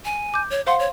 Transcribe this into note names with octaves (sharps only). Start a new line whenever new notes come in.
G#5
D6 G6
C#5
C5 F5 F#5 C6
C#5